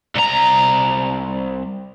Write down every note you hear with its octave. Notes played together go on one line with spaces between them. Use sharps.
C2 A#5